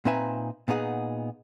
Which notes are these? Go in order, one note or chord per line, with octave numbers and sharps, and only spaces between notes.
A#2 C4 D#4 B4 E5 G#5
A#2 B3 D#4 G#4 F#5